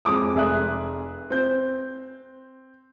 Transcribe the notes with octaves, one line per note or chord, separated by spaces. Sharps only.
F2 G#3 D6 D#6
F1 G#4 E5 D#6 F#6
C4 G6